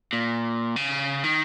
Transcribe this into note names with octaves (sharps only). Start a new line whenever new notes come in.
A#2
C#3
D#3